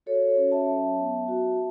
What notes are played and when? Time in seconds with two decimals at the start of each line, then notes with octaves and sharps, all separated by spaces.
0.06 F#4 A4 C#5
0.37 C#4
0.52 E5 A5
0.68 F#3
0.98 B3
1.28 F#4